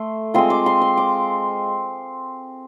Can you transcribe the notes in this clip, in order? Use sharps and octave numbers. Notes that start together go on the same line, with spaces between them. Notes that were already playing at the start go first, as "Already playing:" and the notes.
Already playing: A3 C6
G#3 C4 F4 C6
D6
C6
C6
D6